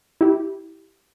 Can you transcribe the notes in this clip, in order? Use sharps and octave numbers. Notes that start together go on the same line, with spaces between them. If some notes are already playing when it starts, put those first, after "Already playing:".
E4 G4